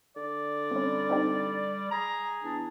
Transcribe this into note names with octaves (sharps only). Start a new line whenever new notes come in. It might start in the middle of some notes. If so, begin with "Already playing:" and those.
D3 D5
G3 C4 C#4
C4 D#4 G4
G#4 A#5
E2 D4